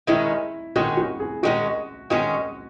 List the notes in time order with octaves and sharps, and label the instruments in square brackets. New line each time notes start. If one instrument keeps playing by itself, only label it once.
[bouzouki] D#3 G#3 C#4 [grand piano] E4
[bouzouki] D#3 G#3 C#4 [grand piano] F#4
[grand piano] F#4
G#4
[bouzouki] D#3 G#3 C#4 [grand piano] F#4
[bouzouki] D#3 G#3 C#4 [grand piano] F#4